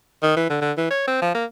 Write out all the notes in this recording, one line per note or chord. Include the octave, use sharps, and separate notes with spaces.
D#3
E3
D3
D3
E3
C#5
C4
F3
A#3